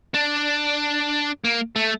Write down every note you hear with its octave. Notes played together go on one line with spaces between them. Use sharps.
D4
A#3
A3